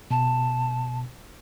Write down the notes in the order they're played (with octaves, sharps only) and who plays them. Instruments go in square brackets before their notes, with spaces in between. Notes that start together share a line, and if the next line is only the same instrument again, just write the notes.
[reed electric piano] B2 [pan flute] A5